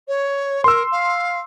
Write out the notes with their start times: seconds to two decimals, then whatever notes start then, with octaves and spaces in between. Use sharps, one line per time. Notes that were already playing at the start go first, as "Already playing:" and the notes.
0.08 C#5
0.64 A#4 C6 E6
0.91 F5